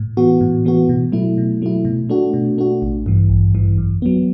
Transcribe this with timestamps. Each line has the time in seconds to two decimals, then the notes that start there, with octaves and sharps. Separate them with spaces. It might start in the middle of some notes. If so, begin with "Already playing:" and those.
Already playing: A2
0.17 E3 B3 F#4
0.41 A2
0.65 E3 B3 F#4
0.89 B2
1.12 F#3 A3 E4
1.38 B2
1.62 F#3 A3 E4
1.85 B2
2.10 A3 D4 F#4
2.34 B2
2.58 A3 D4 F#4
2.82 A1
3.06 G2 E3
3.30 A1
3.55 G2 E3
3.78 F#2
4.02 F#3 B3